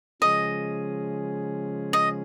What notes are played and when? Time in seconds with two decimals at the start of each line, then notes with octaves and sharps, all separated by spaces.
0.22 C#3 F3 G#3 C#4 G#4 D#5
1.93 D#5